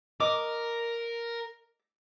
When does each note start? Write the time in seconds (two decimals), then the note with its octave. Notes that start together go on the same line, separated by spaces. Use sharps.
0.20 A#4 D#5 D6